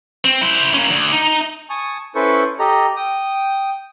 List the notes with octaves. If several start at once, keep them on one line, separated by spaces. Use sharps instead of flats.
C4
E4 C5
A#3 C#4
D2
D#4
G#5 A5 C#6 D#6
C#4 E4 A4 B4 C5 C#6
G4 A4 D#5 A#5
G5 D#6